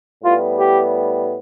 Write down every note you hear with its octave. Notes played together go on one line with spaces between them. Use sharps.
A2 G3 B3 F4
G4